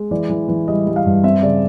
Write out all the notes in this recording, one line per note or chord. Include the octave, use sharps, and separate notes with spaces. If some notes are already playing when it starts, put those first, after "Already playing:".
Already playing: G#3
E3 D5
E3
E3
G3 D#5
G3
F5
G2
C4 E5
C#3 D5